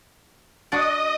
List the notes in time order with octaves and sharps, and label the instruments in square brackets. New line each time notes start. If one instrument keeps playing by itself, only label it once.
[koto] D4 F#4 D5 [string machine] D#5 D#6